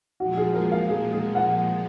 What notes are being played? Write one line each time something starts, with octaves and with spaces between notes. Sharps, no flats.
A#2 F3 G#3 F#4
G#4
A#4
F5
G#4
G#4
F#5